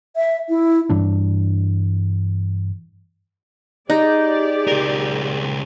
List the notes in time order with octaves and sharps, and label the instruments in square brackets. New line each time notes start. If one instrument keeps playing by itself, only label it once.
[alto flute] E5
E4
[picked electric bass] G2 E3 D4
[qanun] D#4 [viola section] G4 G#4 D5
[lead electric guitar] C#2 A#4